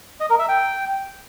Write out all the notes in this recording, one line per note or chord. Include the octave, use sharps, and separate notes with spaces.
D#5
A#4
E5
G5